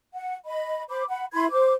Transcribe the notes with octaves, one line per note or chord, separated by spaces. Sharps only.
F#5
D#5 B5
C5 B5 D6
F#5 B5
E4 B5 C6 G#6
C5 D6